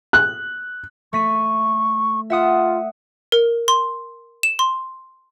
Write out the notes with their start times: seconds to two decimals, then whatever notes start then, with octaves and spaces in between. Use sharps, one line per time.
0.13 F#6
1.13 A3 C#6 B6 D#7
2.30 F4 E5 F#5 D#6
3.32 A#4
3.68 C6
4.43 E7
4.59 C6